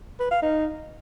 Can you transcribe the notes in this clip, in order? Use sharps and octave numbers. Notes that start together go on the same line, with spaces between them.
B4
F5
D#4